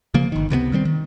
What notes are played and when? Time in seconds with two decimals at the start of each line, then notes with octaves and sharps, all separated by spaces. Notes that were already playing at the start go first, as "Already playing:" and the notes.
0.14 C#3 F3 A#3
0.32 G1 D#3
0.50 C#2 C3 F#3 B3
0.72 D#3 G3 G#3 C4
0.85 D#3